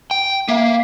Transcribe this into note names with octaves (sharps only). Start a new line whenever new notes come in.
G5
A#3 E5 F5